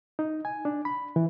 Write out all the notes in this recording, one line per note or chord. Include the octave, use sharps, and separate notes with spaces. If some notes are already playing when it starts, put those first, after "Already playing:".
D#4
G#5
D4
B5
E3